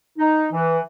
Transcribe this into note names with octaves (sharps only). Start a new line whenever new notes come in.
D#4
E3